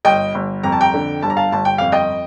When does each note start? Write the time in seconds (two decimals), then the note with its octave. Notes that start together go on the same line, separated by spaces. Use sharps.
0.05 G1 D#5 G5
0.35 G1
0.63 F2 A#5
0.72 A5
0.81 G5 A#5
0.94 D3
1.22 G1 A5
1.30 A#5
1.37 F5 A5
1.52 G1 A5
1.65 G5
1.78 F2 F5
1.92 D#5 G5